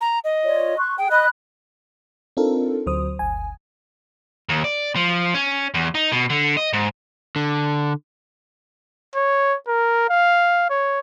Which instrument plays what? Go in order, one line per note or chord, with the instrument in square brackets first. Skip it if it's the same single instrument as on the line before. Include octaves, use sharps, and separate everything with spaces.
[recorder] A#5
D#5
[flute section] F4 C#5 D5
C6 C#6 F#6
[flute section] G#4 [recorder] G5
[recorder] D#5 [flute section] B5 D#6 F#6
[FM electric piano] C4 D4 D#4 F4 A4 A#4
D2 F#3 C5 D#6
G1 D2 G#5
[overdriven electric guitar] D#2
D5
F3
C#4
E2
D#4
B2
D3
D#5
G#2
[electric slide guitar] D3
[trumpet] C#5
A#4
F5
C#5